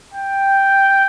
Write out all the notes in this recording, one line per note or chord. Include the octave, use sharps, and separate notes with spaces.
G5